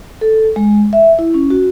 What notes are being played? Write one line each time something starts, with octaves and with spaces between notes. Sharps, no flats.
A4
G#3
E5
E4
C#4
F#4